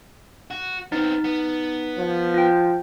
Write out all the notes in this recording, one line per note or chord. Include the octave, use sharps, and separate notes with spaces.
F#4
B3 C4 D#4
B3
F3
F4 G5